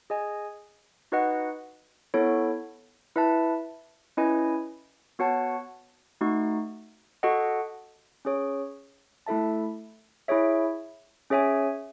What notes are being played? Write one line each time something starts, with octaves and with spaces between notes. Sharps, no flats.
G#4 D#5 G#5
D#4 F#4 B4 D#5 F#5
B3 E4 A4 C#5
E4 B4 E5 A5
C#4 E4 B4 D#5 G#5
B3 F#4 C#5 F#5 A5
A3 D#4 F#4
F#4 A4 D#5 F#5
C#4 G#4 C#5
A3 E4 A4 E5 A5
E4 G#4 C#5 E5
C#4 G#4 C#5 E5 G#5